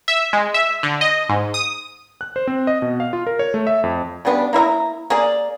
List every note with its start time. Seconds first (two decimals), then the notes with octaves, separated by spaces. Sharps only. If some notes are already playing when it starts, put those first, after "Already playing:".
0.08 E5
0.33 G#3
0.54 E5
0.83 D3
1.01 D#5
1.29 G#2
1.54 D#6
2.21 F#6
2.36 C5
2.47 C4
2.67 D#5
2.82 B2
3.00 F5
3.13 F4
3.27 A#4
3.39 C#5
3.54 A3
3.67 E5
3.84 F2
4.25 C#3 G3 B3 D4
4.53 A#3 E4 E5 A#5
5.10 A#3 G#4 D5